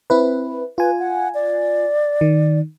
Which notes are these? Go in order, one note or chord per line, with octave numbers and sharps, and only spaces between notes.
C4 E4 B4
F4 B4 G#5
F#5
D5
D#3